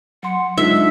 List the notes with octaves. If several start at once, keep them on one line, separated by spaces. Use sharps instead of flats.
F#3 F#5 C6
G#2 D4 F4 D#5 E5